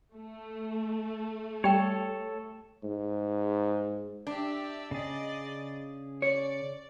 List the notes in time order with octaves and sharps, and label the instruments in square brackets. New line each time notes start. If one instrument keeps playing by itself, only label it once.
[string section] A3
[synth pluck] G3 [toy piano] G4 G5 [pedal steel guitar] A4 C#5
[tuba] G#2
[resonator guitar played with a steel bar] D4 [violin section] G4 D5 E5
[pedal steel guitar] C#3 G#4 [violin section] D5 D#5 A6
[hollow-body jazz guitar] C#5 [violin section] D5